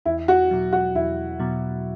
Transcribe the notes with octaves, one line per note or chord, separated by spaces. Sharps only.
E2 E4
F#4
B2 F#3
F#4
E2 E4
B2 F#3